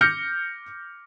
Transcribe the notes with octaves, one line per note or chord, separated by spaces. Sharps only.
D6 F6 G6 A#6 C#7